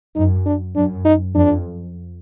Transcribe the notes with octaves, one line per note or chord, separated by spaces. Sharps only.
F#2 D#4
D4
F#2 D4
D#4
F2 D4